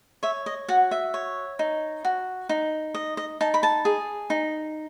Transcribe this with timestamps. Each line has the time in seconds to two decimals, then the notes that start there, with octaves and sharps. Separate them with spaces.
0.23 C#5 E5
0.46 D#5
0.68 F#4 F#5
0.91 E5
1.14 C#5
1.59 D#4
2.05 F#4
2.49 D#4
2.94 D#5
3.17 D#5
3.41 D#4 A5
3.54 B5
3.63 A5
3.85 G#4
4.30 D#4